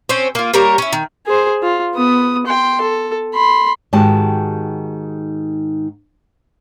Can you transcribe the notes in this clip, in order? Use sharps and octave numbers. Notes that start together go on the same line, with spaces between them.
C4 C#4 C5
A#3 F4
G3 A#3 A#4 C#5
C#4 E4
D#3
G#4 C5
F4
B3 D#6
G5 C6
A4
B5 C6
G#2 D#3 F#4 G4 A5